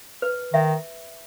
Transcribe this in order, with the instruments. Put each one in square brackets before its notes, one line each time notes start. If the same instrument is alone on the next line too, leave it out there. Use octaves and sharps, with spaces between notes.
[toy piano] B4
[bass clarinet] D#3 [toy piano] E5